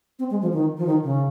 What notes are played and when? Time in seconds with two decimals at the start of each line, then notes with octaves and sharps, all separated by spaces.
0.19 C4
0.31 G#3
0.42 F3
0.53 D#3
0.78 F3
0.87 D#3
1.04 C#3